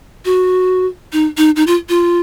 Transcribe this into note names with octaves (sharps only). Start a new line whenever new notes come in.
F#4
D#4
D#4
D#4
F4
F4